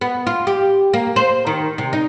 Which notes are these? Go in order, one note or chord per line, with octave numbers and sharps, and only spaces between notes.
B3
F4
G4
A#3
C5
D#3
C3
D#4